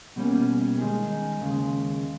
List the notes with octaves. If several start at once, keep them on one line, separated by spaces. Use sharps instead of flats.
B2 G3 A#3 C#4
D#3 G#3 D#4 G#4
D#2 C#3 G#3